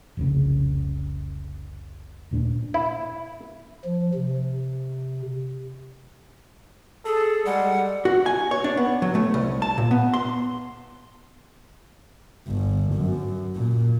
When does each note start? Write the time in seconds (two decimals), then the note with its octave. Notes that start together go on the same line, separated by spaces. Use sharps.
0.17 F1 C2 C#3
2.31 D#1 A#2 B3 D4
2.74 E4
3.84 F3
4.15 C3
7.06 G#4 A4
7.46 G3 G#3 F#5
8.05 F#4
8.26 G#5
8.51 C#5
8.64 D4
8.77 B3
9.02 F#3
9.15 A3
9.34 C2
9.62 A5
9.78 A#2
9.91 B3
10.14 C6
12.48 G1
12.95 F#2
13.56 A#2